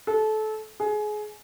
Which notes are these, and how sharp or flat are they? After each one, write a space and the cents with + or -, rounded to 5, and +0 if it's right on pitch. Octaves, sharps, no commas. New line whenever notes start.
A4 -25
G#4 +25